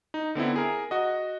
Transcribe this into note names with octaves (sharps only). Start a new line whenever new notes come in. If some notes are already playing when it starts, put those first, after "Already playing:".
D#4
D3 B3 C4 E4
G#4 A#4
F#4 D#5